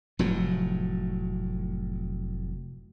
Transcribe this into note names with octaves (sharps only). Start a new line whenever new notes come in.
F1 A2 F#3